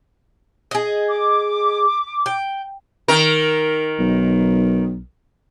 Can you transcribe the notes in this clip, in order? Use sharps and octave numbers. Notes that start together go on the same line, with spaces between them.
G#4 D#5
D6
G5
D#3 A#4
B1